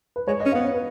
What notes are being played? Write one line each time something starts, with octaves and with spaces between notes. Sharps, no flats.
B4
G#3 C#5
D#5
C#4
B3 F5
C#5
B4